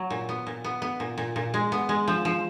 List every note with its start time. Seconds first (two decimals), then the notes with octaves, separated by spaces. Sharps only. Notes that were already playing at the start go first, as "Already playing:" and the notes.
Already playing: F#3
0.10 A#2
0.29 B3
0.47 A#2
0.64 B3
0.82 B3
1.00 A#2
1.18 A#2
1.36 A#2
1.54 G#3
1.72 B3
1.89 G#3
2.08 F3
2.25 F3